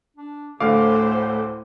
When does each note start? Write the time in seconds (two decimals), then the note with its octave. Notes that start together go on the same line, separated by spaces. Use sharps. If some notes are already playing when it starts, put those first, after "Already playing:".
0.17 D4
0.60 D2 A2 D3 A3 C5 F5 D6